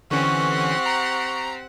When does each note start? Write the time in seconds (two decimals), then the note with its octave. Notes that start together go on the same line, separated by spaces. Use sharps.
0.11 D3 E3 C4 C#4 G4 F#5 C#6
0.86 A#5